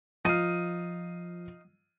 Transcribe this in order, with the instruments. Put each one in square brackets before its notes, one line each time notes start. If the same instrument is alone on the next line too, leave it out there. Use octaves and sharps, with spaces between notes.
[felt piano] F3 D#7 [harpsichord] D#4 F5